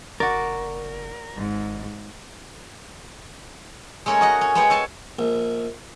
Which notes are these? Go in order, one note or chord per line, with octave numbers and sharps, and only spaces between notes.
F#1 F#4 A#4 D5
G#1 G#2
G#3 A3 C#4 A#4 C#5
F#4 D#5 F#5
C#4
G#3 B3 C#5 F#5 G5
A4 C#5 G#5 A5
A#1